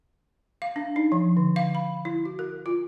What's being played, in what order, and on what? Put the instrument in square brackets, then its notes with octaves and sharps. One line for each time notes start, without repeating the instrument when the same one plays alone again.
[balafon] F5
D4
D#4
F3
D3
F5
B5
E4
F#4
A#4
F4